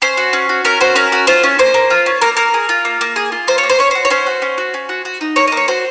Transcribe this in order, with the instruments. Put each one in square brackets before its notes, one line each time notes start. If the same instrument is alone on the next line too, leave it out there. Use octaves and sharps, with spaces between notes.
[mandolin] C#4 C5
F#4
C#4
F#4
C#4 A#4
F#4 C5
C#4 A#4
F#4
F4 C5
C#4
A#3 C5
A#3
F4
C#4
A#3 A#4
A#3 A#4
G#4
F4
A#3
A#3
G#4
F4
A#3 C5
C#5
A#3
C5
C#4 C#5
F#4 C5
C#5
C#4 C5
F#4
C#4
F#4
C#4
F#4
F#4
D#4
A#3 C#5
D#5
A#3
C#5
F#4 C5